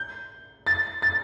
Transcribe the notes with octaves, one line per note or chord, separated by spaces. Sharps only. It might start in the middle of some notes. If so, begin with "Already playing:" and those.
Already playing: G6
A6
A6